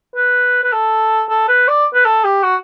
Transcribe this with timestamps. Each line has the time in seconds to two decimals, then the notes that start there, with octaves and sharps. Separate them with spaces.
0.15 B4
0.64 B4
0.72 A4
1.29 A4
1.48 B4
1.68 D5
1.94 B4
2.05 A4
2.24 G4
2.43 F#4